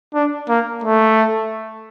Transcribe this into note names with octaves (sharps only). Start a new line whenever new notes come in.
D4
A#3
A3